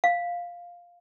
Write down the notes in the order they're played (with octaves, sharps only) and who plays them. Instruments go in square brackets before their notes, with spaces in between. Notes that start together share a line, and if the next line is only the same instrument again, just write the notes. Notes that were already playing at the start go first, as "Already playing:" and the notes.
[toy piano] F5